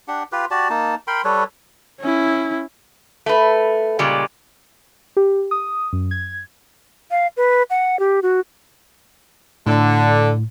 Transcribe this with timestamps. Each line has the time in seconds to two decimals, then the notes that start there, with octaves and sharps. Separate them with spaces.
0.08 D4 G4 F#5
0.32 F4 G4 B4
0.51 F#4 G4 D5 A5
0.70 A#3 D#4 A5
1.07 A#4 G5 B5 C6
1.25 G3 A4 B4 C#5
2.00 C#4 E4
3.26 A3 B4
3.99 A#2 C#3 G3 G#3
5.17 G4
5.51 D#6
5.93 F#2
6.11 G#6
7.11 F5
7.37 B4
7.70 F#5
7.99 G4
8.23 F#4
9.67 A2 D3